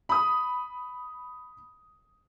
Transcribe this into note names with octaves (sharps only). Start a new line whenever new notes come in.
B5 D#6